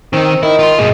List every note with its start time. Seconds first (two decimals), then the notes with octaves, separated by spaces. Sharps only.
0.13 D#3 C4 D#4
0.43 D#3 E4
0.59 F4 C6
0.78 G2 B2 G#3